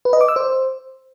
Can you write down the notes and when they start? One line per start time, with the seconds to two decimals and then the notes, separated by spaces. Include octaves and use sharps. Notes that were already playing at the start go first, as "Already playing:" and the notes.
0.05 B4
0.13 D#5
0.21 D6
0.28 E6
0.36 C5